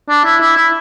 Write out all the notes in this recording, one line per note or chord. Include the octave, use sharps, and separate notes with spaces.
D4
E4
E4
E4